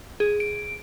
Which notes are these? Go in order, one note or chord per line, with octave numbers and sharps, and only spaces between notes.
G#4
D7